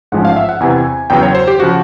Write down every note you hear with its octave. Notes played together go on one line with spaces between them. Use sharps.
A1 G#2 F3 G#3 C#4 F#5
F5
E5
F#5
E2 C3 E3 G#5
E2 C#3 F#3 B3 G5
C#5
C5
G4
C#3 F3 F#4